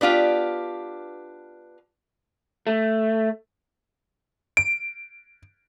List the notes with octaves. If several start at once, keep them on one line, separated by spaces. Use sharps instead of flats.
B3 D4 F4 G4
A3
D7